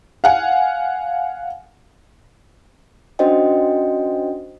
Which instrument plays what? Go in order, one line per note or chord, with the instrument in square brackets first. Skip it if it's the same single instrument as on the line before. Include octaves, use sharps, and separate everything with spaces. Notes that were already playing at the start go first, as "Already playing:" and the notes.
[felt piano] F5 F#5 G#5
[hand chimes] C#4 D4 F#4 C5 D#5 G5